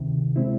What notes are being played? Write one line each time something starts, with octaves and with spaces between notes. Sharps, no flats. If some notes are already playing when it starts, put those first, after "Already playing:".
Already playing: D2 C3 D#3
B2 G#3 C4 E4